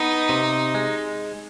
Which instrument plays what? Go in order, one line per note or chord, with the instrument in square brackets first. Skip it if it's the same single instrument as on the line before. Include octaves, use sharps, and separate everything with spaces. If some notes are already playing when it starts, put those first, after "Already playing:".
Already playing: [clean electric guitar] B3 [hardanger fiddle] D#4
[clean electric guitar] C3
G#3